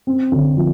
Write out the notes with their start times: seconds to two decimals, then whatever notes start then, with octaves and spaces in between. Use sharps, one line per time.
0.07 C4
0.32 D3
0.57 F3